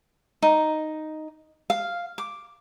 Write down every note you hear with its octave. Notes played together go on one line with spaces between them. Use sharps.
D#4
F5
D6